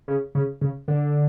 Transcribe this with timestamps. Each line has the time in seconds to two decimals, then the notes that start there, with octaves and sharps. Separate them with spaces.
0.08 C#3
0.35 C#3
0.61 C#3
0.88 D3